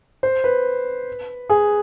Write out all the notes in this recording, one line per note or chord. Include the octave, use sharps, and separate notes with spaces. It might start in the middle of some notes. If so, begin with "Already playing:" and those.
C5
B4
G#4